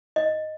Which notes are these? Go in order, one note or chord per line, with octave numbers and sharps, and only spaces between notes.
D#5